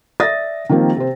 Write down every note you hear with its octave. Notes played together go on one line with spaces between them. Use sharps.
D5 E5 D#6 A6 A#6
D#3 F3 G3 A#3 C4
C3 C5